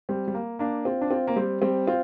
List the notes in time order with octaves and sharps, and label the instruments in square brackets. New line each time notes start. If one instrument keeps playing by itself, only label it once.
[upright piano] G3 C4
G3
A#3
A#3 D4
C4 F4
D4
C4 F4
A#3
G3 C4
G3 C4
C4 F4